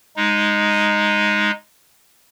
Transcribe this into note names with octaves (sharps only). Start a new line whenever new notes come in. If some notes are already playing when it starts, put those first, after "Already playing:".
G#3 D#4